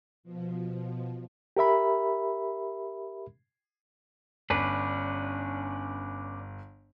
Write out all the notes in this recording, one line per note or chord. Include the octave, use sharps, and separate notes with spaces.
B2 F3
G4 A#4 E5 B5
G1 C#4 D4 B4